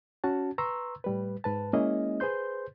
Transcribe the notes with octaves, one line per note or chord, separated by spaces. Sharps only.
C#4 F#4 A5
B4 A#5 C6 C#6 E6
A2 G3 B4
G#2 B4 A5
G#3 A#3 C#4 E4 G#4 D#5
G#4 B4 C5 C6 G6